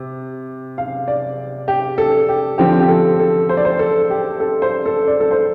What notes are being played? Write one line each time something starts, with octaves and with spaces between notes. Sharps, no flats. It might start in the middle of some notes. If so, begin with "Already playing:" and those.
Already playing: C3
F5
D5
G4
A4
G4
D3 F3 C4 G4
G4
A4
A4
C5
D5
C5
A4
G4
A4
C5
A4
D5
A4
C5